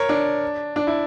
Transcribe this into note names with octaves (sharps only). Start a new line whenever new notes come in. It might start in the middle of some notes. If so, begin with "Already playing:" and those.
Already playing: A#4 C#5
D4
D4
E4